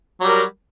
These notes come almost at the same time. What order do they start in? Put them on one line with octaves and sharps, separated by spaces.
F#3 G3 A#4